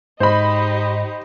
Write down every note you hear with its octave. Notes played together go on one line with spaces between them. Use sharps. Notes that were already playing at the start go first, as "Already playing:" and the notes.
G#2 D#4 G4 C5 D#5 B5